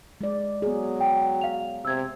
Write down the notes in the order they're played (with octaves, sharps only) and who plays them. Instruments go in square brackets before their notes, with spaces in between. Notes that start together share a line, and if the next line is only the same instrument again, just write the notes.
[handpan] G#3 D5
[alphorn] F#3 [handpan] B3 G#4
[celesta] G5
F5 F7
[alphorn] C3 [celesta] E6 G#6